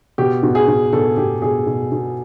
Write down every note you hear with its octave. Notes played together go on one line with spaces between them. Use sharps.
B2 G4
B2
G#4
B2
B2 A4
B2 G4
B2 G#4
B2
B2